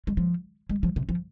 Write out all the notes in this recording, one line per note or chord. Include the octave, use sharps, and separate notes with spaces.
G#3
F3
G#3
F3
C3
F3